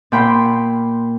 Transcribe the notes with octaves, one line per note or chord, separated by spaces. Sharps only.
A#2 G5 B5 C6